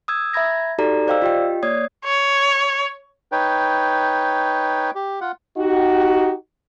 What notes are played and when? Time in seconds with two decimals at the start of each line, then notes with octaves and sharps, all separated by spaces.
0.08 D#6 E6 G#6
0.34 E5 A#5 B5 G#6 A#6
0.78 D#4 F#4 G4 A4 D5 A#5
1.07 C5 D5 D#5 F5 G5 E6
1.22 F4 G4 D#5 G5
1.63 A#3 C#5 D5 D#6 G#6 C7
2.05 C#5
3.32 D#4 B4 C#5 G5
4.95 G4
5.21 F4 F#5
5.57 D#4 F#4 G4